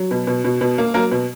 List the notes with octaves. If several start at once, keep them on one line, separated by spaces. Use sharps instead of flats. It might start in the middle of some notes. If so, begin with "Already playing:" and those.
Already playing: F#3
B2
B2
B2
B2
A#3
F#3 A#3 A#4
B2